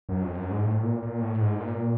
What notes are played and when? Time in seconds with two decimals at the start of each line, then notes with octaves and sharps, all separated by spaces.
0.09 F#2
0.22 F2
0.37 F#2
0.51 G#2
0.65 A2
0.83 A#2
1.03 A#2
1.22 A2
1.40 G#2
1.60 A#2